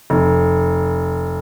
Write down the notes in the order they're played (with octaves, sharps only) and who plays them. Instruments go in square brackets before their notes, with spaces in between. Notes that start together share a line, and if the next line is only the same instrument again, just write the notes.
[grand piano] F1